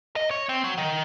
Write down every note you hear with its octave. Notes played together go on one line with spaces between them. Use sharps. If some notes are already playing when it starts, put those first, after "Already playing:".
D#5
C#5
C4
F#3
D#3